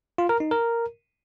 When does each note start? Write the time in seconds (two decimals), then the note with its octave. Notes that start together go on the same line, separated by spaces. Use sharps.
0.18 F4
0.29 A#4
0.40 D#4
0.51 A#4